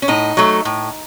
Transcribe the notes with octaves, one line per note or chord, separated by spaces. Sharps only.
C#4
A2 D#4
F#3 A3
A2